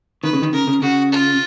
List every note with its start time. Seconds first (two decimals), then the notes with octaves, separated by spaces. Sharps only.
0.23 D#3 B4
0.33 C#3
0.42 D#3
0.53 C#3 A#4
0.67 C#3
0.82 C#3 F#4
1.11 F4